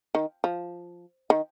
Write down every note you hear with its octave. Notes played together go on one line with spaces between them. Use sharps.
D#3
F3
D#3